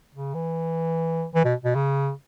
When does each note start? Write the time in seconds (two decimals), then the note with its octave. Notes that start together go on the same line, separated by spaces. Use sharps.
0.15 C#3
0.34 E3
1.35 E3
1.45 B2
1.64 B2
1.75 C#3